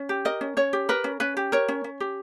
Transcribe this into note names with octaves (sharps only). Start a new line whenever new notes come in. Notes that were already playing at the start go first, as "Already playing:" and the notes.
Already playing: C#4
G4
A#4 D#5
C#4
C#4 C#5
G4
A#4 B4
C#4
C#4 B4
G4
A#4 C#5
C#4
C#4
G4